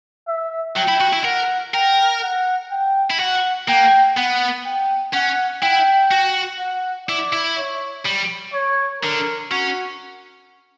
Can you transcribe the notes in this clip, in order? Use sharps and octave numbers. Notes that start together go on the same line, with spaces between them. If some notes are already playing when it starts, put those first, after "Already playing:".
E5
F#3 G5
E4
F#4
E4
A#4 F#5
A#4 G5
F#5
G5
E4
F#4 F#5
A#3 G5
B3 F#5
G5
C#4 F#5
E4 G5
F#4
F#5
E4 D5
E4
C#5
G3
C#5
D3 A#4
C#4 F#4